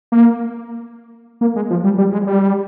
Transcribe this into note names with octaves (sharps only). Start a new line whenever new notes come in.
A#3
A#3
G#3
F3
G3
G3
G#3
G3